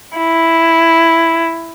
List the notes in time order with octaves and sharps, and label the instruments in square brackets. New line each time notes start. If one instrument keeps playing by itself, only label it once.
[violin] E4